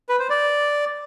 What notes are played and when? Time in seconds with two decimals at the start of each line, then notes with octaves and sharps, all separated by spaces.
0.09 B4
0.19 C5
0.30 D5